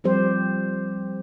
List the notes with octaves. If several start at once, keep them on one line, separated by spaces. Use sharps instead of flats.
F3 G3 C4 G4 C5